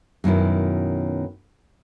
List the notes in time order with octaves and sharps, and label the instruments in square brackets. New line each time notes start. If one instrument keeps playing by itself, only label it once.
[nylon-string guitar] F#2 B2 D#3 E4